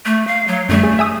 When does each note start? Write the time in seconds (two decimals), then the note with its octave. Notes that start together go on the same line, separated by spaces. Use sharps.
0.05 A3
0.27 F5
0.48 F#3
0.69 F#2 D3 G3 A3
0.83 G#4
0.99 E5 G#5 D#6